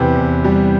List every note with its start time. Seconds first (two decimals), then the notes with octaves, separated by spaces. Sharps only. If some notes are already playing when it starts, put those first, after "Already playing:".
Already playing: E2 C3 G4 B4
0.16 E2
0.44 G3